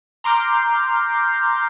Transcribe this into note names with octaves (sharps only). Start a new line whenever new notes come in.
A#5 C6 D6 F6 G6